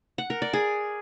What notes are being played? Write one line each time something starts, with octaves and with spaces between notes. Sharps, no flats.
F#5
A#4
D5
G#4